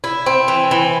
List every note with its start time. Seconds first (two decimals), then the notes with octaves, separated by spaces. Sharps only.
0.04 E4
0.26 C4
0.48 E3
0.71 E3